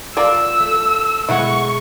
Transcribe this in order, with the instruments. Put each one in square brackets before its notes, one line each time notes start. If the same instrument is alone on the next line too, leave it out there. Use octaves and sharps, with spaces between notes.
[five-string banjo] F4 A#4 D5 [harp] D6 [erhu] E6
[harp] A3
[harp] B2 G#3 [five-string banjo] E4 B4 F#5 [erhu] C#6